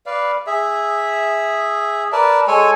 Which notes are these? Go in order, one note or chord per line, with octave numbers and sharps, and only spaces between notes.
B4 D5 F5
G#4 E5
A#4 B4 D5 A5
G#3 A4 C#5 G#5